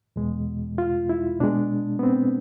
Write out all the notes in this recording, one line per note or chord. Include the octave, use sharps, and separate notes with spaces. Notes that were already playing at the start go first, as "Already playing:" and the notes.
E2 B2 G#3
F4
E4
B2 G#3 D4
B3
C4